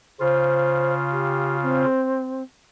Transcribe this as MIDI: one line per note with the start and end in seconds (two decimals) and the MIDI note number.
0.20 1.85 49
0.20 1.85 65
0.20 0.93 72
1.12 1.57 67
1.62 2.42 60